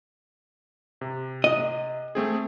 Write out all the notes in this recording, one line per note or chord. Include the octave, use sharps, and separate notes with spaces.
C3
D#5
A3 C4 G#4